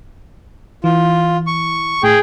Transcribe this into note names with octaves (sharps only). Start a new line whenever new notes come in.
E3 F4
C#6
A2 G#4 G5